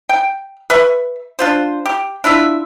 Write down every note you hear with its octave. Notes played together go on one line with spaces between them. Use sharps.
G5
B4 E5 C#6
D4 F4 C5
G4
D4 E4 F4 E5